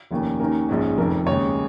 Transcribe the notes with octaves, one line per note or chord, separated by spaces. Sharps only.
F1 D#2 D#3 A#3 C#4
D#2 D#3 A#3 C#4 A#4
A#1 G#2 G#3 C#4
F1 F2 D#3 A#4
D#2 C#3 G#3 C#5